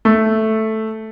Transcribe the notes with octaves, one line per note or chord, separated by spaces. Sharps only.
A3